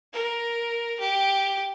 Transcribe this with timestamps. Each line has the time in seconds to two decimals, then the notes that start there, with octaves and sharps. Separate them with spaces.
0.13 A#4
1.00 G4